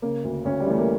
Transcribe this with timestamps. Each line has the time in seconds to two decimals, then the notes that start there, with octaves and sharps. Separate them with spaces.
0.02 C#3 A#3
0.24 D2
0.45 D2 C#4
0.60 G3
0.67 E3 A3
0.79 A#3